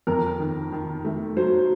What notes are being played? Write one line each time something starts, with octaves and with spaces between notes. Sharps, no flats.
F2 A#4
D#3
D#3
A3
F#3 C5